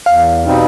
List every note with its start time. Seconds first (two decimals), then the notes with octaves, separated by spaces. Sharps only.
0.06 E2 F5
0.45 B2 G3 C4 D#4